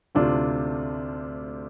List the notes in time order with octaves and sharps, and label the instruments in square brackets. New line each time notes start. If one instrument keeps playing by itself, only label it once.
[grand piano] D2 C3 A3 D4 F4